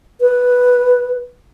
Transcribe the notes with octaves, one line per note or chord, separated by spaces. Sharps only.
B4